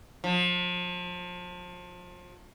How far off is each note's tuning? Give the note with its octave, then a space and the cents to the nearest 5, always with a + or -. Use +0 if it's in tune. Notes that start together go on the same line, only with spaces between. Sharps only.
F3 +35